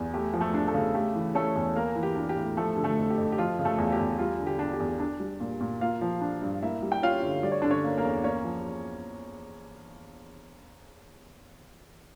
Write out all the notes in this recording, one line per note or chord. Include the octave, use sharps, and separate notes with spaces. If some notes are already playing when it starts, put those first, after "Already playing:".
Already playing: E2
A3 G4
F3
A3 A4
D4
A3 A4
C#3
A3 G4
E3
A3 C#4 A4
E2
A#3 A#4
E3
G4
D4
G4
A2
F3 A3 A4
D3
A3 A4
F2
G4
F2
G4
F3 F4
C#3
A3 A4
E2
G4
E2
G3 F4
D3
G4
D4
G4
E2
D4
G3
A#2
A#2
A#3 F4 F5
F3
D4
G2
A#3 E4 E5
G3
G5
C#4 F4 F5
D3
G3 D5
C#5
D3 D4 D5
C#4 C#5
A#3
A#3 A#4
E2
A#3 C#4 C#5
F3